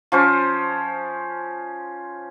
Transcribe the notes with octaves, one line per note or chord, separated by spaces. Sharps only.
F3 C#4 C5